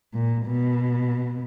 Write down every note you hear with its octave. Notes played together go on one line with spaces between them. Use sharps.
A#2
B2